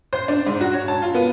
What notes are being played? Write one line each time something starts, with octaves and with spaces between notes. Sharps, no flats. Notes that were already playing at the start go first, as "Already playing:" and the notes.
C5
D4
G#2
F#4
C#5
A5
F4
B3